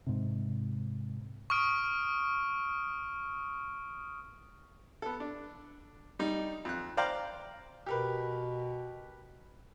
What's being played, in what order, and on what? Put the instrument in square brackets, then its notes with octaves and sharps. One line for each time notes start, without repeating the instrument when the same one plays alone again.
[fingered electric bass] G#2 C3
[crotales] C#6 D#6 F6 D7
[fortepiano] B3 A4
D4
G3 D#4
F2 F#6
C5 D5 F5 G5 A#5
[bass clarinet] B2 [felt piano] G4 A#4 B4